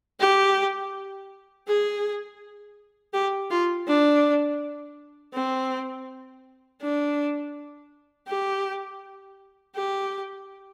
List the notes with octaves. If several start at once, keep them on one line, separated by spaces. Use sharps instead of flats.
G4
G#4
G4
F4
D4
C4
D4
G4
G4